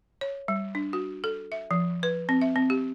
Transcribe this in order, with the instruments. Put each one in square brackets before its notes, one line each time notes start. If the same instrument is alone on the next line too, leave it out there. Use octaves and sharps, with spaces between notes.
[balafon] C#5
G3
D4
F#4
A4
E5
F3
B4
C4
E5
C4
G4